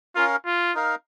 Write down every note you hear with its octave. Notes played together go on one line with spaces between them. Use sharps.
C#4 F4 A#4 F5
F4
D#4 A#4 F5